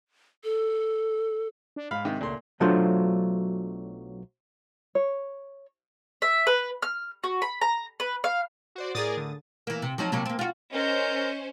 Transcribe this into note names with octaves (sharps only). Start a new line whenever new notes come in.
A4
D4
G#2 F5 B5
C3 D#3 G4
C#2 A#2 A3 C6
B1 F#3 A3 D4 F4 C5
C#5
E5
B4
F6
F#4
B5
A#5
B4
F5
F#4 C5 D5
A2 G#4 A#4 D5 D#6 A6
D3
E3 A#3
C3
F3 F#3 D#4
C3 F#3 A#3
A#3 C4
F4 F#4
C#4 A#4 C5 D#5 G6